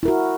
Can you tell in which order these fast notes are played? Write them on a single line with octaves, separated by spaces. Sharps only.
E4 A#4 F#4